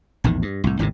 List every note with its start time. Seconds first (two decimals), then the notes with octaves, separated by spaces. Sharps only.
0.24 A#1 E2 A2 D#3
0.42 G2
0.64 C2 A2
0.79 G#1 D#2 A2 C3